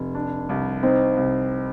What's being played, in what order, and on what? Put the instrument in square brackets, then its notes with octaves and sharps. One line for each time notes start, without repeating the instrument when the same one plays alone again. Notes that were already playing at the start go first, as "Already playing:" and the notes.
Already playing: [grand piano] F1
D4
C2
[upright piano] C4 [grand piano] D#4
[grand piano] C2